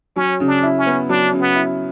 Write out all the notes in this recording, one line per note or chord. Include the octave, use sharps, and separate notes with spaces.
F#3 C#4
C#3
D4
E4
C#4
B3
F#3 D4
C#3
B3
E4